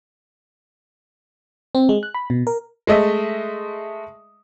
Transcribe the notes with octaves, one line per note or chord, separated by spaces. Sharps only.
C4
G#3
F#6
B5
B2
A#4
G#3 A3 D#5 E5